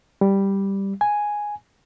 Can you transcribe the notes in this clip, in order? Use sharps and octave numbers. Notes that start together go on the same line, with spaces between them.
G3
G#5